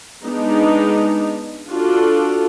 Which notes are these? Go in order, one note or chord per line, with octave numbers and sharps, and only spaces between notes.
G#3 B3 D4 D#4
D4 F4 F#4 A4